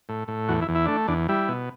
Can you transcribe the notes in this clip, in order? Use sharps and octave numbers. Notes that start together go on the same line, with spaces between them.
A2
A2
E2 F#4
E4
E2
E4
A3 D4
E2 D4
G3 E4
B2